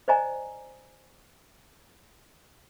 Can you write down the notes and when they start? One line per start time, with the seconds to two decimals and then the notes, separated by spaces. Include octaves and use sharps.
0.08 C5 D5 D#5 G#5 A#5